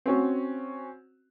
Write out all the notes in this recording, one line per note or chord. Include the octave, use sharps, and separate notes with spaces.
C4 C#4 F#4